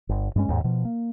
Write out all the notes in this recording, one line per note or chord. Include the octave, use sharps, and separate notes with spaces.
G1
G2 G#3 C#4
D#2 G#2
B2 F3
A#3